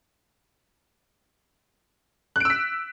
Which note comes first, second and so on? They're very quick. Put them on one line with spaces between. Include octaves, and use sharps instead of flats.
F#6 D7 E6 B6